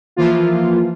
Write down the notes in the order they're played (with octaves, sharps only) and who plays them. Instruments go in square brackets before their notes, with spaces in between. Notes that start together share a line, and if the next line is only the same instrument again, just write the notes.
[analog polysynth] E3 F3 A#3 F4